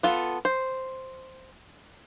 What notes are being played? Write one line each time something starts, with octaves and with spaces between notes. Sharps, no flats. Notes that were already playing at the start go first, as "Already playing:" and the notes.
B3 F4 A4
C5